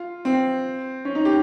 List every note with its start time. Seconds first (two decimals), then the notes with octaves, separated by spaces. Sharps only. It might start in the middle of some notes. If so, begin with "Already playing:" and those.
Already playing: F4
0.25 C4
1.05 C#4
1.15 D#4
1.25 G4